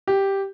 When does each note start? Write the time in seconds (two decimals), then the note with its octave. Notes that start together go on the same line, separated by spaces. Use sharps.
0.07 G4